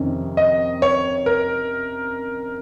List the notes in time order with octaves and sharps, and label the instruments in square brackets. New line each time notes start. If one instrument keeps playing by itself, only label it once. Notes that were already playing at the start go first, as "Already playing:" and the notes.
Already playing: [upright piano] F2 C3 D#3 C#4
[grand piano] D#5
C#5
A#4